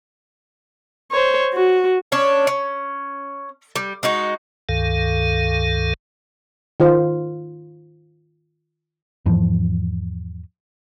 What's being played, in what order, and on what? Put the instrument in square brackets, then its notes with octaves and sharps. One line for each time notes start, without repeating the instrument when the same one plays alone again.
[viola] C5 C#5
F#4
[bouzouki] C#4 D4 C#5
C#4
G3
G#3 D#4 F#4
[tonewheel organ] C#2 G2 D#3 A4 F5
[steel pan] D#3 F4 C5
[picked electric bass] E2 G#2 E3 F3